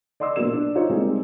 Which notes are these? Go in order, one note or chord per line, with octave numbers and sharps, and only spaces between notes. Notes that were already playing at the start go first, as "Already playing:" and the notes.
D5 D#5 C6 D6 E6
A#1 B2 F#3 A#3 E7
D4
D#4 F4 C5 C#5
G3 G#3 A#3 C4 D#4